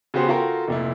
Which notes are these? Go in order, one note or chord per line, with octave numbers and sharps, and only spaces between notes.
C#3 B3 F#4 G4 C5
F4 F#4 A4 A#4 G5
F1 A#2 E4